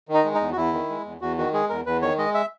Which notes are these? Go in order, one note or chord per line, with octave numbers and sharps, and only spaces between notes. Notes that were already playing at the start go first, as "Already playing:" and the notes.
D#3
D#4
G#3
D#4
E2
F#4
E2 E4
D#3
G#3
E2
E2 F#4
D#3 F#4
G#3 G#4
E2 A#4
E2 B4
D#3 C#5
G#3 D#5
E5